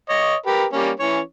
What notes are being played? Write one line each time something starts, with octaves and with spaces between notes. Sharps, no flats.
C#5 D#5
G4 A#4 B4
G3 A#3 C#4
E3 C#4 C#5